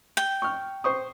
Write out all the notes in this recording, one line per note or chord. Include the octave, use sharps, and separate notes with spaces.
G5
C#6 F6
C5 C#6 D#6